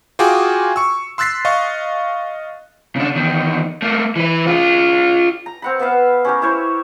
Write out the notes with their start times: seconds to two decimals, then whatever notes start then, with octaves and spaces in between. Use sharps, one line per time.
0.19 F4 F#4 G#4 G5 G#5 D6
0.76 C#6 E6
1.18 C6 E6 F#6 A6 B6 C7
1.45 D#5 F5 C#6
2.96 C#3 D4
3.15 E2 D#3
3.82 A3 A#3
4.16 E3 B4
4.47 F4 G#4
5.46 A#5
5.62 C4 F#5 B5
5.79 B3 B4 E5 F5
6.25 C#4 G4 A#4
6.42 E4 C5 C#5